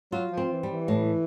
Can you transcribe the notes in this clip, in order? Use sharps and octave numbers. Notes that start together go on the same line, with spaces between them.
F#3 F4
F3
C4
E3
G3
E3
A2